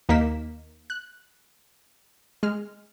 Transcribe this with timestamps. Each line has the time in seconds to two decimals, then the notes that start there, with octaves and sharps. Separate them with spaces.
0.09 D#2 A#3 D#4 A#4 B6 E7
0.90 F#6
2.43 G#3 F6